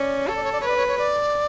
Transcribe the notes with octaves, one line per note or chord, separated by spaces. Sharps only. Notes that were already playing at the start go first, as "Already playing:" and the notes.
Already playing: C#4 D5
A4 C#5
D5
C#5
D5
B4 C#5
D5
C#5
C#5
D5